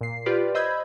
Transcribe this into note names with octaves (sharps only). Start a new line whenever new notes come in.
A#2 C7
F4 G4 B4 D5
C5 D#5 B5 E6 G6 G#6